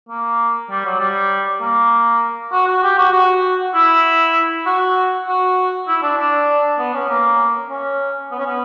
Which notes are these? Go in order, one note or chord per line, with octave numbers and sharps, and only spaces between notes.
A#3
G3
F#3
G3
A#3
F#4
F#4
G4
F#4
F#4
E4
F#4
F#4
E4
D4
D4
B3
C#4
A#3
C#4
B3
C#4
B3